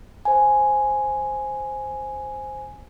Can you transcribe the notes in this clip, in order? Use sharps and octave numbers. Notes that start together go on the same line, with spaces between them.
C5 G#5